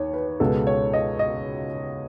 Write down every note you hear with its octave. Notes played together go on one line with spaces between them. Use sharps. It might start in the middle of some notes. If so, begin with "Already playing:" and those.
Already playing: D#2 C#5
B4
C#2 B2 G#3 B3 A4
C#5
D#5
D#5